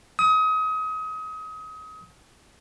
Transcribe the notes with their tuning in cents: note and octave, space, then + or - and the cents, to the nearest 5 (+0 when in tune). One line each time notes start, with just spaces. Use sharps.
D#6 +30